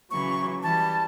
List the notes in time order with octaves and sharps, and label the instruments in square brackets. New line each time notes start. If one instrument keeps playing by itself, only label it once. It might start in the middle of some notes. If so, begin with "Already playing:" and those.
[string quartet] C#3 E3 F#3 [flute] C#6
[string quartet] E3 G3 [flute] A5